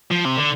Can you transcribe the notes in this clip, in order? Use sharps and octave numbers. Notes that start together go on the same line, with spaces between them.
F3
C3
D3